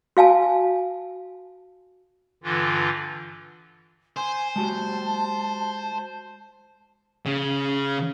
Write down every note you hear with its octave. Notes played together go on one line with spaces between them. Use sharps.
F#4 F5 G#5 A5
G2 D3 E3 F4
C5 G#5
G#3 F#4 G4 A5
C#3